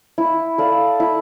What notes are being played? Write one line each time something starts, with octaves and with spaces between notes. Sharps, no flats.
E4
A4 D5 F5
E4